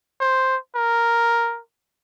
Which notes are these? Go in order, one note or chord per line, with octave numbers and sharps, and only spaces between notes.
C5
A#4